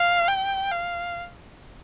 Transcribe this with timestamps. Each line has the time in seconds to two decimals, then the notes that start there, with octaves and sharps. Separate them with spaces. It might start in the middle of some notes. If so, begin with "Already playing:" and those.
Already playing: F5
0.28 G5
0.72 F5